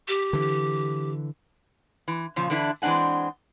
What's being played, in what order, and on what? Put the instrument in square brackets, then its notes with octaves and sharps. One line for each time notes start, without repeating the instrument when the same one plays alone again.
[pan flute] G4
[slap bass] D3 E3
[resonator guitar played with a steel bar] E3
A#2 C#3 F3
D3 E3 D4 E4
E3 G#3 C4 D4 F#5 G#5